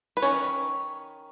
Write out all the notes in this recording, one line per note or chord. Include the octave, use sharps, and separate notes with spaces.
B4
D#3 F#3 C#4 C#5